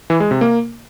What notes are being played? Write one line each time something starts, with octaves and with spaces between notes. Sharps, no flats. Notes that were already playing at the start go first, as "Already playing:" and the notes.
E3
G#3
C3
A#3